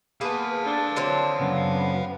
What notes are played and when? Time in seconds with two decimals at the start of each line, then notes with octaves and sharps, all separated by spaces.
0.21 A#3 B3 G#4 B4 F5 A5
0.64 D4 A4
0.96 D3 F#3 C4
1.39 F#2 A#2 C#3 B3